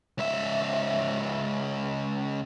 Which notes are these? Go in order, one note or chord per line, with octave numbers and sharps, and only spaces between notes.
C#2 E5